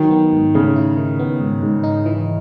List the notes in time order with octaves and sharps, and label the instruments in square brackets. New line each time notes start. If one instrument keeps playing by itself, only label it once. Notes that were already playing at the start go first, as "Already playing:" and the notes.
Already playing: [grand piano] D#3 [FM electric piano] F#3
[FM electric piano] B3
G#2
[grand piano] C#3 [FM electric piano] A3
[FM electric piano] E4
D#3
B3
G#2
G#2
D#4
E3